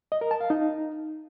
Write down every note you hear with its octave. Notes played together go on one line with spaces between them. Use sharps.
D#5
A#4
A5
F5
D#4